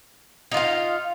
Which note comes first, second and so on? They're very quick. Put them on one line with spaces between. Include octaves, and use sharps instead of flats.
D#4 F4 F5